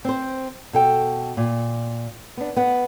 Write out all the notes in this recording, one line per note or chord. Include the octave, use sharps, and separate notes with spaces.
C4 C5
B2 A4 G5
A#2
B3 D4
B3 F#5